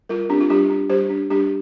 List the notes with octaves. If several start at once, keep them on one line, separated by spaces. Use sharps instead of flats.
G3 F4 A#4
C4 D4 G4
F4
G3 D4 G4
D4
G3 G4 C5
D4
G3 D4 G4